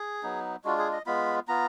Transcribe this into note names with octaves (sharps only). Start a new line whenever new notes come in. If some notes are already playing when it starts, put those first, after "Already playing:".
Already playing: G#4
F#3 B3 D#4
G#3 D4 F4 F#4
G#4
D#5
G#3 B3 F4 B5
B3 F4 A#5